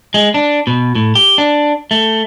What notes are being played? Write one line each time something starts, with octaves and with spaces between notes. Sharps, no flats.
G#3
D4
B2
A2
G4
D4
A3